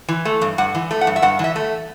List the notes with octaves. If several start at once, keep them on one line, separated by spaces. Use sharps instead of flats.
E3
A3
G2
G2 F#5
E3
A3
F#5
G2
E5
G2 F#5
E3 E5
A3